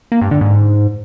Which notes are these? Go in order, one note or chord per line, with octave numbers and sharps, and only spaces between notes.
A#3
G2
D3
G#2